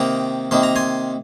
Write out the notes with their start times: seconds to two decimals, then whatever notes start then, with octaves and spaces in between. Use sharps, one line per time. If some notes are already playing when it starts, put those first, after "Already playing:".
Already playing: C3 D#3 A#3 D#4 G5 A#5
0.51 C3 D#3 A#3 D#4 C6
0.63 A#5
0.76 G#5 C6